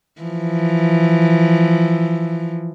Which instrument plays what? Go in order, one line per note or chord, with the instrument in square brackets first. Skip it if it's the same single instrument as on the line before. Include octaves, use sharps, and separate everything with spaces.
[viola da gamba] E3 F3